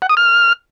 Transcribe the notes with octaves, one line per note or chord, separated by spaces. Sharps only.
F#5
D#6
F6